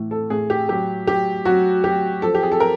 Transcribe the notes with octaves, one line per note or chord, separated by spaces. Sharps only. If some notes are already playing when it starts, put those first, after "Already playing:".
Already playing: A2 E3
A4
A2 G#4
G4
F#3 G4
F#3 G4
F#3 F#4
F#3 G4
F3 A4
G4
G#4
A4
F3 A#4